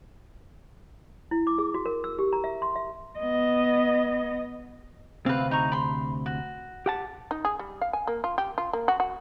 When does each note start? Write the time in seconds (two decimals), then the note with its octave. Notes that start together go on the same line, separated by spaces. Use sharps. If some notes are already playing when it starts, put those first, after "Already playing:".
1.31 E4
1.47 D6
1.58 G#4
1.74 F#4
1.86 A#4
2.04 E6
2.19 G4
2.33 A#5
2.44 E5
2.62 C6
2.76 E5
3.19 B3 D#5
5.26 D2 C3 C4 B4 F5
5.51 D#4 A#5 C#6
5.72 B5 C6
6.26 F#4
6.86 G4 F#5 A5
7.31 D#4
7.45 G#4
7.59 G3
7.81 F5
7.93 G#5
8.07 A#3
8.24 F4
8.38 G4
8.58 F4
8.73 A#3
8.88 F#4
9.00 F#4